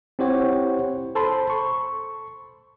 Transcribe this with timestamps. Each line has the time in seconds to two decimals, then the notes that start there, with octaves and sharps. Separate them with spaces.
0.19 C4 E4 G4 C5 C#5 F#5
1.15 A4 C5 A5 B5 C6
1.50 C#6